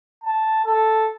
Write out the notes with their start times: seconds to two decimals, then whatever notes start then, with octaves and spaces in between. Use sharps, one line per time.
0.23 A5
0.65 A4